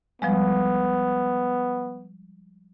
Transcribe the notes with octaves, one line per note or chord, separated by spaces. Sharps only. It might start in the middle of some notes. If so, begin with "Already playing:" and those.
F3 G3 G#3 B3